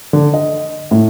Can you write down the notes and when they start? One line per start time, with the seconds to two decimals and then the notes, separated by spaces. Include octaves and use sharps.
0.13 D3
0.34 D#5
0.91 A2